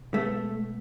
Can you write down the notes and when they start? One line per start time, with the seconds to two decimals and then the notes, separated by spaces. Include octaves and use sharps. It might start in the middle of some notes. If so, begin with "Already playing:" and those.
Already playing: B2
0.14 B2 G#3 A3 B3